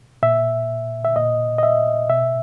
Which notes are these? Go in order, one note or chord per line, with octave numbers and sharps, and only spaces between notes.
A#2 E5
E5
A#2 D#5
D#5
E5
B2 E5